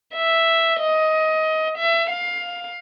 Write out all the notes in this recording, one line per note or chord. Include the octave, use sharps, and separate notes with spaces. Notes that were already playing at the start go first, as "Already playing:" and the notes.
E5
D#5
E5
F5